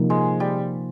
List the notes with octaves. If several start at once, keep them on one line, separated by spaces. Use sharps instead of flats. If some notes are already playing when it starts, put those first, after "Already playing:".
Already playing: C3 F3 A#3 D#4
G#3
G3